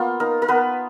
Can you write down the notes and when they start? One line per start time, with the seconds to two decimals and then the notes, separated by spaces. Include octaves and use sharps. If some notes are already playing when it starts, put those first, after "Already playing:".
Already playing: A#3 B3 F4
0.20 D#4 A#4
0.42 A#4
0.48 B3 B4